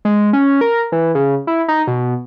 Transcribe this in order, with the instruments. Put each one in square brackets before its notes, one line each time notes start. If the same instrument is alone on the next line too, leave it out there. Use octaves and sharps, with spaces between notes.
[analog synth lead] G#3
C#4
A#4
E3
C#3
E4
D#4
B2